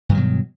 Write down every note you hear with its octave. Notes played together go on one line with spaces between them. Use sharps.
G2 B2 D#3 F#3